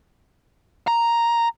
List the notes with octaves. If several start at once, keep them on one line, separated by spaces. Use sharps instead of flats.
A#5